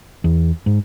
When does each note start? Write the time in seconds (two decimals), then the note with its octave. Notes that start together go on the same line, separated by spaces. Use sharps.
0.24 E2
0.66 G#2